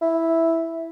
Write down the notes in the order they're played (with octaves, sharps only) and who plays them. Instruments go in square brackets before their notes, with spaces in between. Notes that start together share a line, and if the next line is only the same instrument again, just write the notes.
[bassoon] E4